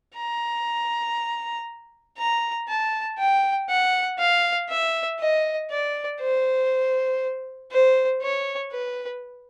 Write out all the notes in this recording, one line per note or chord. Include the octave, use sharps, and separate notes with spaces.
A#5
A#5
A5
G5
F#5
F5
E5
D#5
D5
C5
C5
C#5
B4